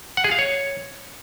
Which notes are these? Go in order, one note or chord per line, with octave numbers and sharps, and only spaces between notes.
F#5
G#4
F5
C#5